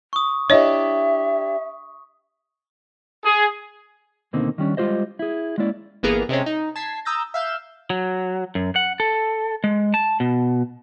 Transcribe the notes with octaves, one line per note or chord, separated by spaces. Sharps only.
C#6 D#6
D4 E4 G4 C#5 D#5 E5
G#4
D#2 B2 D3 A#3 C4 D#4
D#3 G3 C#4 D4
G3 G#3 F4 G4 C5 D#5
E4 G#4
G#3 A#3 C#4 E4 D5
G1 E3 A#3 B3 G#4 A#5
C3 G#3 C4 C#4
D#4
A5 G#6 B6 C7
A#5 D#6 E6 G6 A6 A#6
E5 F5 G6 E7
F#3
F#2
F#5
A4
G#3
A5
B2